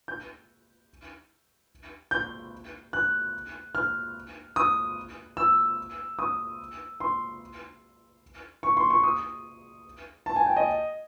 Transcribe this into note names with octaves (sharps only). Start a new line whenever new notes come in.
G6
G6
F#6
F6
D#6
E6
D#6
C6
C#6
C6
C#6
D#6
A5
G#5
G5
D#5